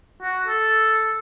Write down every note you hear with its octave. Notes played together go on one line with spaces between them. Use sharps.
F#4
A4